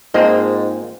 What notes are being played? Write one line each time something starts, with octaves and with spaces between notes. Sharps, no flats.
G#2 A#3 C4 F4 G#4 D#5 A5